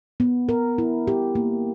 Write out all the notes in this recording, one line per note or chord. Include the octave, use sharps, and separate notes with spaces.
B3
A#4
E4
G4
A#3